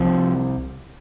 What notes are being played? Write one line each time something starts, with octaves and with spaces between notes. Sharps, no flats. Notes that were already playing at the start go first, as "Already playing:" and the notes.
Already playing: C2 C3 F3